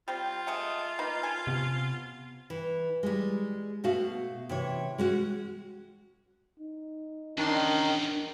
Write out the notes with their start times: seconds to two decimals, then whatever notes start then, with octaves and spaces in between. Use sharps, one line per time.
0.08 G3 C4 F4
0.47 G#3 A3 F#5
0.99 A#3 D#4 B4
1.23 A4 G#5
1.47 C3 B3
2.50 E3
3.03 G3 G#3
3.84 B2 A3 F#4 F5
4.49 C3 E3 C#5
4.98 G#3 C#4 F#4
6.60 D#4
7.38 E2 D#3 C#4 D4 C6